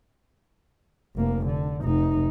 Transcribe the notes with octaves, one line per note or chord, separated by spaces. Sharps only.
F1 A#3
D3
F1 D#4